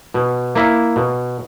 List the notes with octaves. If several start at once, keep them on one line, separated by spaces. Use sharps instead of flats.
B2
A#3 E4
B2